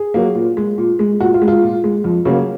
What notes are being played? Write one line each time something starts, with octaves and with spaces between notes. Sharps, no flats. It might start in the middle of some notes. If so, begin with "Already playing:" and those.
Already playing: G#4
F#3 A#3
A#2
G#3
A#2
G#3
A#2 F#4
F4
G#3
F4
A#2
G#3
F2
C#3 F#3 A#3